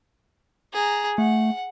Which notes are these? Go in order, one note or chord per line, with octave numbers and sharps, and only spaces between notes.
G#4 A#5
A3 F#5